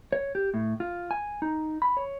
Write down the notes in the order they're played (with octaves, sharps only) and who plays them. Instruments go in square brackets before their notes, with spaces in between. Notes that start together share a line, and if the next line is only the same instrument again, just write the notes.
[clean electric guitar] C#5
G4
A2
F4
G#5
D#4
B5
C#5